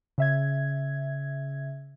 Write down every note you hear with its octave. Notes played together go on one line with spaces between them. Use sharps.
C#3 E5 G#6